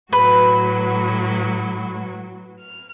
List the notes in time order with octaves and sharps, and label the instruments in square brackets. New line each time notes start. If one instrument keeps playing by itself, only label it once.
[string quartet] A2 F#3 F#4 [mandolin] B4
[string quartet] F6